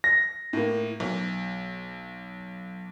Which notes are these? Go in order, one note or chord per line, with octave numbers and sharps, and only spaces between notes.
A#6
A2 A#3
B1